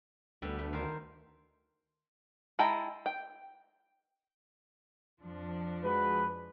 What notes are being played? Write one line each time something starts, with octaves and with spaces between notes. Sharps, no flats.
D2 D3 G3 B3
A3
D#3 A#4 C5
G#3 E4 G5 A5 A#5
G5
F2 F3 D4
G#3 F#4 B4